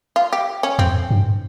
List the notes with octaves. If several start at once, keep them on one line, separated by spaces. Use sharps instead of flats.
F4
G4
C#4
F2 C4
G2